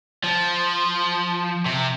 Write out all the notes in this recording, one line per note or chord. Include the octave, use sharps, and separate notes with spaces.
F3
C3